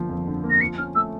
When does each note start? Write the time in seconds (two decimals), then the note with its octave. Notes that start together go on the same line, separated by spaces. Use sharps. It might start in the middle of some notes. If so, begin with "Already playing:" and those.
Already playing: G1 D3 F3 A#3
0.09 F2
0.27 D3
0.44 A#3
0.50 A#6
0.61 F3 C#7
0.78 C#4 F6
0.95 A3 E6